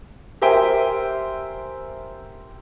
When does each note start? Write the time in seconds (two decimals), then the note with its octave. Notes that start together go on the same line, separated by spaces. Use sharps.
0.42 G4 A#4 C5 E5 G5 G#5